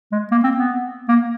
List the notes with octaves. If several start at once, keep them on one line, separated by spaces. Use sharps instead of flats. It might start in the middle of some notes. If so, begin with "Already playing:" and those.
G#3
A#3
C4
B3
A#3